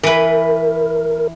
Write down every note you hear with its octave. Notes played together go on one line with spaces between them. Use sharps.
E3 A#4 B4